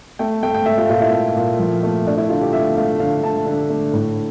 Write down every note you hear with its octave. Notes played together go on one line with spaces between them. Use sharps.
A3 G5
A3 G5
G5
A3 E5
F4
A#2 F4
E4
A3
A#2
F3
A3
A3 D4
E4
D3 F4
G4
A3 E5
A3 F5
D3 F5
D3 A5
D3
A3
A2